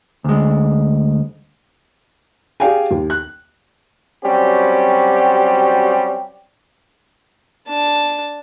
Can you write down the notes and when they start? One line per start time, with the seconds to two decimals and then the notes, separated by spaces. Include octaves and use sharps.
0.24 D2 G#3
2.60 G4 G#4 D5 F5 G5 G#5
2.91 D#2
3.10 F#6
4.25 F#3 G3 C4 C#4 F#4 G4
7.68 D4 A5